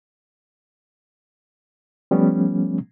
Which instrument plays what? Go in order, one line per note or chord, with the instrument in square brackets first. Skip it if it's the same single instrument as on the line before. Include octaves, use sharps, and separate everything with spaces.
[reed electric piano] F3 G3 A3 B3 C#4